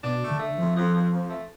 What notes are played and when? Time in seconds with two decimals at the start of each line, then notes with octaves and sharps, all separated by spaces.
0.04 B2 D4
0.22 A3
0.31 D3
0.40 A3
0.58 F2 F3
0.76 F2
0.94 F2
1.12 F2
1.31 A3